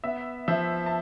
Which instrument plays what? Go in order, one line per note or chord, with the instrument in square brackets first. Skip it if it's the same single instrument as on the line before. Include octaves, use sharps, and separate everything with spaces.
[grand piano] B3 [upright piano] E5
[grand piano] F3 [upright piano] E5
[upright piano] A5